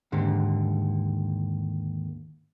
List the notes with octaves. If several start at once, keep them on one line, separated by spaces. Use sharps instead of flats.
D#2 G#2 D3